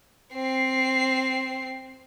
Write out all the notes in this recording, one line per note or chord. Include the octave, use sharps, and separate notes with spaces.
C4 C7